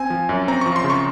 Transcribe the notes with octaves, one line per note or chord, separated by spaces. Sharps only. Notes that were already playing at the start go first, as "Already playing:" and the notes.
Already playing: C4 G#5
F3
F#2
C4 A#5
F3 C#6
C6
C#3
C#6